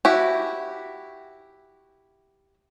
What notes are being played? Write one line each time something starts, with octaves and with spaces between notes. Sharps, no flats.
E4 F#4 G4